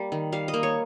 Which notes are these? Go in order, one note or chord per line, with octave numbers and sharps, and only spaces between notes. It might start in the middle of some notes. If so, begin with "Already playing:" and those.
Already playing: G3 A#3
D#3
G3 F5
D#5
A#3
C#5